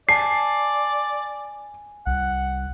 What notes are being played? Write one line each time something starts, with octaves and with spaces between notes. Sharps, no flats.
D5 G#5 A5 C7
C2 F#5